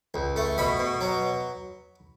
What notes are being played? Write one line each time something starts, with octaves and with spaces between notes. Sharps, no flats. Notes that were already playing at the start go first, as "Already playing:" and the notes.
C#2
A3
B2 B5
B2
F#3